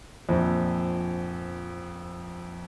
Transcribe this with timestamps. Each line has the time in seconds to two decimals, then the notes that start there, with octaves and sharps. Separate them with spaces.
0.29 A#1 F2